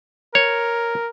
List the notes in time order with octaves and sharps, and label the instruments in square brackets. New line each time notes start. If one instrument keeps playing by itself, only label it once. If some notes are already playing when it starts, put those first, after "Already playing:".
[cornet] A#4 [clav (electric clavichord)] C#5